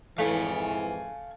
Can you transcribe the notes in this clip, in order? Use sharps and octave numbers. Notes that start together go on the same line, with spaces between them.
F2 G#2 E3 A3 F5 G#5